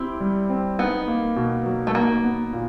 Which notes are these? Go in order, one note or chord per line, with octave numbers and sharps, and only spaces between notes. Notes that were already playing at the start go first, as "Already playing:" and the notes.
Already playing: C4 E4 G4
G3
C4
B3 D#4
A#3
B2
F#3
A3
A#3 D#4
B3
A#2